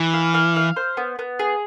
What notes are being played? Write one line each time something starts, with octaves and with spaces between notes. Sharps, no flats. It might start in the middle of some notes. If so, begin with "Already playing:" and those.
Already playing: E3
F5
F5
F5
C5
B3
B3
G#4